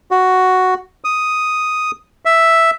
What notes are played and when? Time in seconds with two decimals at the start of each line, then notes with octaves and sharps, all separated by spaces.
0.11 F#4
1.04 D#6
2.25 E5